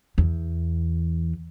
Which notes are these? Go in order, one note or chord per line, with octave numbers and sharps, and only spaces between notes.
E2